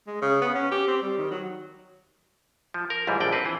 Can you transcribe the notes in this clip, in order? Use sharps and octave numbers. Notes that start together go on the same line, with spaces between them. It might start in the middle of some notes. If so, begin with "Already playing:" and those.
G#3
C#3
B3
C#4
G4
C4
G3
D#3
F#3
F3
A#4
C#2 G#2 E3 G3
A#1 D3 D5 G5
C4 B4
E3